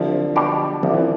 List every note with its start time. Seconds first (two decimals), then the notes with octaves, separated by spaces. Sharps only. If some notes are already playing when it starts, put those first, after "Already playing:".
Already playing: C2 D3 F3
0.36 B2 G3 D4 G4
0.83 C2 F3
0.93 E3